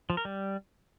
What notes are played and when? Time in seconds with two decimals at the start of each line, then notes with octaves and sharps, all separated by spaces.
0.10 F3
0.17 A#4
0.25 G3